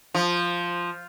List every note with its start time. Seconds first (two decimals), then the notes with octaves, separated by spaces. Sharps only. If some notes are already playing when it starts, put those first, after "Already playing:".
0.14 F3